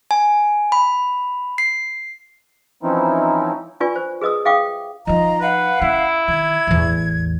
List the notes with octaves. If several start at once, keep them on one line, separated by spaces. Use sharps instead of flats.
G#5
B5
C7
E3 F3 C4 C#4 D#4 E4
D4 F4 B4 D5 G#5 C#6
C5
G#4 B4 D#5 D#6 E6
G#4 E5 F5 G5 D6 D#6
F3 D#4 F4 D#5 A#5
B4 F5 F#5
C#4 E4
D#3 G#6
A1 E2